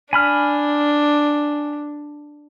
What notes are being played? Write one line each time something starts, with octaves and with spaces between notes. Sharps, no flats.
D4 G#5 B5 F6